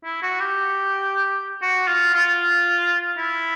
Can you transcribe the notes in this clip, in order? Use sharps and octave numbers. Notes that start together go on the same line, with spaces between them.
E4
F#4
G4
F#4
F4
F4
E4